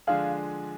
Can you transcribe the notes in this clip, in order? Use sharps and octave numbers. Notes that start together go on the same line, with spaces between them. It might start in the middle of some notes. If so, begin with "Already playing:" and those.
D3 F3 G#3 D4 G#4 F5